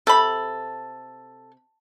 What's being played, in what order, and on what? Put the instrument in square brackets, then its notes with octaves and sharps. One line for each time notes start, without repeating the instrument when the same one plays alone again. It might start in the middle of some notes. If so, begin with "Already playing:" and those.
[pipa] C3 B5 [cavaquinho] A4